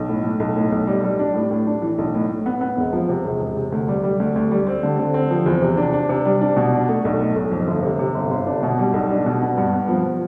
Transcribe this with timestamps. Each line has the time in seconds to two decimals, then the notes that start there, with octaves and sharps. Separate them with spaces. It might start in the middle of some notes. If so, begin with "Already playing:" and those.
Already playing: B1
0.09 A2
0.24 A2
0.40 B1
0.56 A2
0.72 B1
0.87 G3
1.04 G3
1.19 D4
1.34 A2
1.51 A2
1.67 D4
1.82 E3
1.98 B1
2.14 A2
2.30 A2
2.46 B3
2.61 B3
2.77 E1
2.93 F3
3.09 C3
3.24 E1
3.40 E1
3.56 C3
3.72 D2
3.88 G3
4.03 G3
4.20 D2
4.36 D2
4.51 G3
4.67 C4
4.83 D3
4.99 D3
5.14 C4
5.31 F3
5.46 E2
5.62 C3
5.77 D4
5.93 D4
6.09 C3
6.25 G3
6.41 D4
6.56 B2
6.73 D4
6.89 A3
7.05 B1
7.19 A3
7.36 B1
7.51 F2
7.68 G1
7.83 C3
7.99 C3
8.15 G1
8.31 G1
8.46 D4
8.63 B2
8.78 G3
8.93 B1
9.10 D4
9.26 B2
9.42 B3
9.58 G2
9.73 B3
9.89 F3
10.04 F3